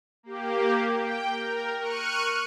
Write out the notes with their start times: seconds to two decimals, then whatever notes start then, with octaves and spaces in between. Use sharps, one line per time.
0.23 A#3 G4
0.93 G5
1.29 A#4
1.78 C#6 F6 F#6 C#7 D#7